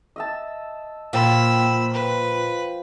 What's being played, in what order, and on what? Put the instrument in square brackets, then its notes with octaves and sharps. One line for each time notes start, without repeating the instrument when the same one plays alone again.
[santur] D#5 E5 A5
[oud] A#2 [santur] F3 G5 C6 [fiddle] B5 E6
[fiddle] B4